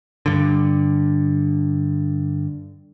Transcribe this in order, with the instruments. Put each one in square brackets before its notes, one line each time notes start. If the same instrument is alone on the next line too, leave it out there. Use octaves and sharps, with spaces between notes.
[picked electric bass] G2 D3